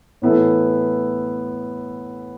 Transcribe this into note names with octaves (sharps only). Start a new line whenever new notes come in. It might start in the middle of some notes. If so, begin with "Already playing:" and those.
A2 E3 B3 E4 A4